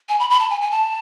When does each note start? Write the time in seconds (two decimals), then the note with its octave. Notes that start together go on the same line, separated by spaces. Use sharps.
0.09 G#5
0.19 B5
0.30 B5
0.40 A5
0.50 G#5
0.61 G#5
0.71 A5